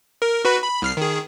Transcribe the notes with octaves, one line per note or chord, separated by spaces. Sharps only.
A#4
F#4 B4 B5
B5
C2 F6 C7
D#3 G#4